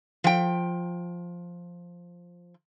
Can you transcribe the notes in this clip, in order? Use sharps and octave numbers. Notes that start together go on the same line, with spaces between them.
F3 G5